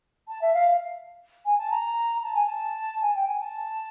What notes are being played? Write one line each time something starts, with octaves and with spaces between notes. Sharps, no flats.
A5
E5
F5
G#5
A5
A#5
A5
G#5
A5
G#5
G5
G#5
A5